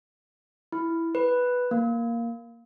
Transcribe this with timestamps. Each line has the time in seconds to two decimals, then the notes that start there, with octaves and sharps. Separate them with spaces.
0.72 E4
1.15 B4
1.71 A#3